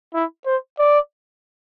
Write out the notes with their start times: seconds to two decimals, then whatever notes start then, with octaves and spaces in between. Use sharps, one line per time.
0.14 E4
0.46 C5
0.79 D5